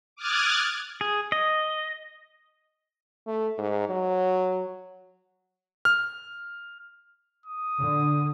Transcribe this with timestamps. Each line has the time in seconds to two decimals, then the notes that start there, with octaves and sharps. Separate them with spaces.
0.16 D6 D#6 F6 F#6 G#6 A6
1.01 G#4
1.32 D#5
3.27 A3
3.58 G#2
3.89 F#3
5.85 F6
7.46 D#6
7.79 D3